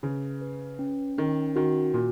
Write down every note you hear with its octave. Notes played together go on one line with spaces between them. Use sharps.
C#3 B4
B4
C#4
D#3 C#4
D#3 F#4
A#2 F#4